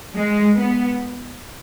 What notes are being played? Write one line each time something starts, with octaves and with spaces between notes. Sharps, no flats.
G#3
B3